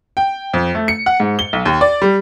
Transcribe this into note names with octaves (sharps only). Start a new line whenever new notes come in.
G5
F2
A3
C#7
F#5
G#2
G7
B1
D#2
D5
G3